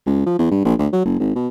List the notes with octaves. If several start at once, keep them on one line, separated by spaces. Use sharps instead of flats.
C#2
F3
E2
G2
A#1
D2
F#3
F#1
G#1
B2